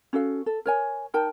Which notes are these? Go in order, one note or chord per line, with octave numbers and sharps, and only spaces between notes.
C#4 F#4 A4 F5
A4
A#4 C#5 G#5
D#4 A#4 G5 A5